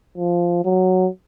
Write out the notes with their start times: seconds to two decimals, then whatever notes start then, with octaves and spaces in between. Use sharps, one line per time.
0.18 F3
0.65 F#3